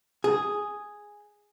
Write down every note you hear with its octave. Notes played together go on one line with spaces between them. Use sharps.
G#4